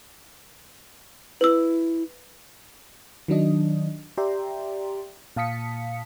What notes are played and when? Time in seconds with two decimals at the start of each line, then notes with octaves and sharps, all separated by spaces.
1.41 E4 B4 E6
3.28 D#3 F#3 D4 D#5
4.17 G4 D5 E5 G5 A#5 C6
5.36 A#2 F5 A5 D#6 B6 C#7